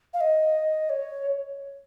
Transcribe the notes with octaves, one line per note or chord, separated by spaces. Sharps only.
F5
D#5
C#5